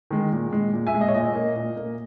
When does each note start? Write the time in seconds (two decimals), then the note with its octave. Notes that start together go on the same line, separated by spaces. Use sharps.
0.11 D#3 G#3
0.32 A#2
0.52 G#3
0.73 A#2
0.87 E5 G#5
0.94 G#3
1.01 D#5
1.08 C#5
1.14 A#2 D#5
1.35 A#3
1.56 A#2
1.77 A#3